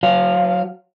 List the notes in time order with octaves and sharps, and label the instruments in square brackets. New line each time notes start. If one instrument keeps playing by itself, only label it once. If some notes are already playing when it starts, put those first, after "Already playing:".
[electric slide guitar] F#3 F5